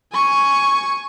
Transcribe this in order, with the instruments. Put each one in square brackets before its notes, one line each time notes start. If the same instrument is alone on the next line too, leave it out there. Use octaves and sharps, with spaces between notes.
[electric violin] G#5 C#6